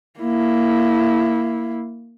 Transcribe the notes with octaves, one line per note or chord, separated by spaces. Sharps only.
A#3 E4